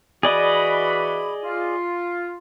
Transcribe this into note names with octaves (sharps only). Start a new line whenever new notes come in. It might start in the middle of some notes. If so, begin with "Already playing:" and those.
E3 F#4 G#4 D5 D#5 B5
F4